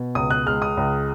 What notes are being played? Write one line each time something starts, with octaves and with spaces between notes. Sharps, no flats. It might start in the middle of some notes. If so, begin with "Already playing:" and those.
Already playing: B2
C#2 D#6
F#6
G#3 F6
D#6
C#2